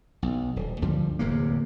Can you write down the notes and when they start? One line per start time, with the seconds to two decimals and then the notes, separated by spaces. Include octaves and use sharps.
0.22 B1
0.56 D#1
0.82 D2 G2 F3 G3
1.19 D1 E2 C3 A#3